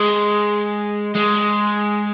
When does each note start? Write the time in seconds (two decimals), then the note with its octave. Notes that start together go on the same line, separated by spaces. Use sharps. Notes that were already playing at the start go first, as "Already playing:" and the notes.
Already playing: G#3
1.15 G#3